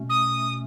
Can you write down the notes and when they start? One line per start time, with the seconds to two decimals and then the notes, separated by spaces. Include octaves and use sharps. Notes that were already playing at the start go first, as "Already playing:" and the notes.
Already playing: B2 A3 C#4
0.10 D#6